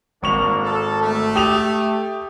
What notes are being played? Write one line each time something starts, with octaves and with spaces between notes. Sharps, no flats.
G#1 A#3 D4 C#6 F7
A4
A3
G4 D#6 F7